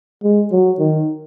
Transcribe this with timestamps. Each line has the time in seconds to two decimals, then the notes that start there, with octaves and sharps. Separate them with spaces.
0.23 G#3
0.52 F#3
0.79 D#3